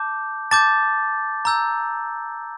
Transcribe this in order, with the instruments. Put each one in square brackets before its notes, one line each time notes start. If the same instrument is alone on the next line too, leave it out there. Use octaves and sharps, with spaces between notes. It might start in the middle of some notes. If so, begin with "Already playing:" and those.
Already playing: [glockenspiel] A5 D6 G6
A5 D6 G6 A6
A#5 E6 G6